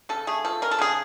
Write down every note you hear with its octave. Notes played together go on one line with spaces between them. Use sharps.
C#3 A4
A3 G#4
F3 A4
C#3 A#4
A4
C#3 G#4